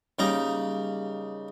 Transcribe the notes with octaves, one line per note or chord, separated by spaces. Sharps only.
C#3 G3 A#3 D#4 G4 A#5